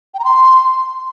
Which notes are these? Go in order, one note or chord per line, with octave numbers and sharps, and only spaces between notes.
G5
A#5
C6